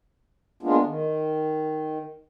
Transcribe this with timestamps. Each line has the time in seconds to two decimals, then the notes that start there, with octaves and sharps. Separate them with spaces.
0.63 G#3 A#3 B3 D4 F4
0.85 D#3